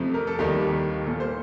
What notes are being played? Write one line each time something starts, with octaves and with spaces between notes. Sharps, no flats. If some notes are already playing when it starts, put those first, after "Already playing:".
Already playing: F2 C3 F3 A3
A#4
A4
D#2 D#3 G3 A#3 G4
A#2 G3 A#3 A4
C5